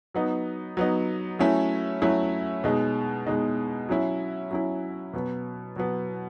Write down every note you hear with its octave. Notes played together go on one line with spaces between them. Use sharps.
F#3 B3 D#4
F#3 B3 D#4
F#3 A3 C#4 E4
F#3 A3 C#4 E4
B2 G#3 D#4
B2 G#3 D#4
F#3 C#4 E4
F#3 C#4 E4
B2 F#3 B3
B2 F#3 B3